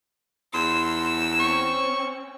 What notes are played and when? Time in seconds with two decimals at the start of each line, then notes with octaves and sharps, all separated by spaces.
0.54 E2 C6 E6
1.40 C4 C#4 C#6